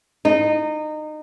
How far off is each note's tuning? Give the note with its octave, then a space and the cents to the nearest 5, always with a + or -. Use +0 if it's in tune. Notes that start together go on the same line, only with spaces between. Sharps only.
D#4 -25